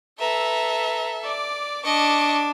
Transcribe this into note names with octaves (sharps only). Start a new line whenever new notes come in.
A4 B4 E5 A#5
D5 D6
D4 D#5 C#6 D6